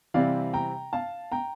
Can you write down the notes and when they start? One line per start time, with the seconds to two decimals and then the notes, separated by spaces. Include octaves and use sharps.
0.14 C3 E3 G3 C4 D5 F5
0.53 G5 A#5
0.93 F5 A5
1.32 G5 A#5